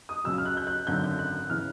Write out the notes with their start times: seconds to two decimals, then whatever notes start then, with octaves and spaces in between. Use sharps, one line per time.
0.09 D#6
0.24 C#2 C#3 F#3 E6
0.38 F6
0.45 F#6
0.57 G6
0.67 F#6
0.87 G#1 F#2 D3 G6
1.04 G6
1.19 F#6
1.50 C#3 E3 F6